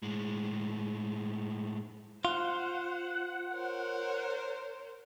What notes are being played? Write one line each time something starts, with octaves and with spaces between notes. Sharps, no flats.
A2 G#3
F4 C5 F#5
A#4 C5 C#5